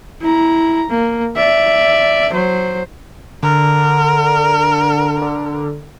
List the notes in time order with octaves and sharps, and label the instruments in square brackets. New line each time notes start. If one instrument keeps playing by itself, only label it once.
[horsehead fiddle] E4 A#5
A#3
D5 E5
F#3 C5
[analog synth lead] D3 [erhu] A#4
[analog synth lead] D3